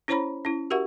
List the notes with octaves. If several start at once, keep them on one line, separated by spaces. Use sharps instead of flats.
C#4 E4 C5 C#5 A#5 B5
C#4 E4
F#4 G4 A#4 E5 F#5 C#6